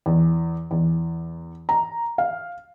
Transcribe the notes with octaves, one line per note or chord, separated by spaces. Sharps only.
E2
E2
A#5
F5